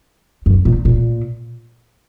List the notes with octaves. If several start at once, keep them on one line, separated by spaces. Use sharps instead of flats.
F#2
A#2
A#2